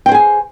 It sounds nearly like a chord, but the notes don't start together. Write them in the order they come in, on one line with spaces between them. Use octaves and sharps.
G5 C5 G#4 G#5